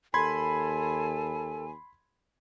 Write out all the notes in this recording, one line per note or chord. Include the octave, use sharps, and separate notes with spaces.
D#2 A4 G#5 B5 C6 G#6